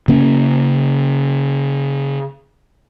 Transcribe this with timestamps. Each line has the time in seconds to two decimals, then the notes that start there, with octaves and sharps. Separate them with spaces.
0.08 C#3 A#3 C#4